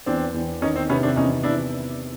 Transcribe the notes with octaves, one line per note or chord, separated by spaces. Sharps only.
E2 C4 D4
E2
D#3 C#4 D#4
C4
C3 B3 C#4
C4 D4
E2 C#4 D#4
E2 D4 E4